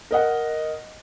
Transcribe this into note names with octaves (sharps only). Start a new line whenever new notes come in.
A#4 D#5 F#5